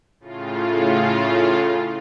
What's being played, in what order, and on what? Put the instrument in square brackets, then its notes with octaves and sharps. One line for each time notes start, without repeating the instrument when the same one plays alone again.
[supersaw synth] A2 C#3 F4